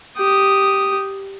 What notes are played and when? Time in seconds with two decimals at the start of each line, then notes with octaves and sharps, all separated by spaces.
0.17 G4 D#6